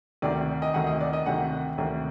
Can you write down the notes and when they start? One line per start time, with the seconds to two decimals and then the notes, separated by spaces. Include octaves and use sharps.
0.22 D2 C3 D#3 D5
0.62 D#5
0.74 D2 C3 D#3 F#5
0.87 D#5
1.00 D5
1.13 D#5
1.26 D2 C3 D#3 F#5
1.78 D2 C3 D#3